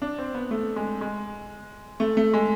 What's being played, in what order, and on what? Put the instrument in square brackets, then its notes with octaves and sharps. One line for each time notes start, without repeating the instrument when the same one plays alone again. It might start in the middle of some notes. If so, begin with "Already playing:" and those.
[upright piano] D4
C4
B3
A3
G#3
G#3
A3
A3
G#3